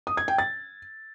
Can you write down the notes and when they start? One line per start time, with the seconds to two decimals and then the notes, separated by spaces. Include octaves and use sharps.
0.07 D#6
0.17 G#6
0.28 G5
0.38 A6